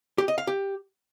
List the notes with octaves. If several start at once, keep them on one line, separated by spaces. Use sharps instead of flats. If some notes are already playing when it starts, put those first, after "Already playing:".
G4
D#5
F5
G4